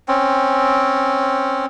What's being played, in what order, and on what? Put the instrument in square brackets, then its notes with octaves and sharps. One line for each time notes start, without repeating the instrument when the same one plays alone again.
[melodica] C4 C#4